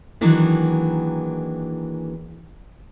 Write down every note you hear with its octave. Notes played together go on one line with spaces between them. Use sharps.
D#3 E3 F#3 A#3 D4 G#4